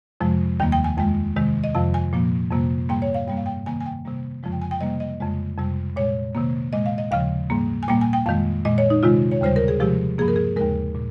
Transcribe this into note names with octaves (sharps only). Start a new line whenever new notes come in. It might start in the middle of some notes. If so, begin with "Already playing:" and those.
F2 C3 F3 G#3
D#2 D#3 G3 A#3 G5
G5
G#5
F2 D#3 G#3 G5
C3 D#3 G#3
D#5
F2 C3 F3 F5
G#5
A#2 F3 A#3
F2 C3 G3 A#3
G#2 G3 A#3 G5
C#5
F5
G2 G3 A#3 G5
F5
G5
C3 D#3 A#3 G#5
G#5
G5
C3 G3 A#3
F2 C#3 F3 G#3
G5
G#5
G5
C3 G3 A#3 D#5
D#5
F2 C#3 G#3
F2 C3 G3
A#2 G#3 C#5
C3 D#3 A#3
A#2 G#3 D#5
F5
D#5
D#2 C#3 F3 F5
G#2 G3 A#3
G#5
A#2 G3 A#3 G5
G#5
G5
F2 D#3 G#3 F5
A#2 G#3 D#5
C#5
D#4
C3 D#3 G#3 F4
C#5
D#2 C#3 G3 C5
A#4
G#4
C3 F3 G#3 G4
G2 F3 A#3 G#4
A#4
G#4
D#2 C#3 G#3 A#4
A#2